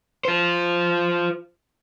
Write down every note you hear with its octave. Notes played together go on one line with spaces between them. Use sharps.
F4 C5